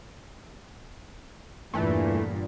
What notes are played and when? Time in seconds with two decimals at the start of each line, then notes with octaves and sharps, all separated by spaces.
1.74 E2 G2 A#2 E3 A3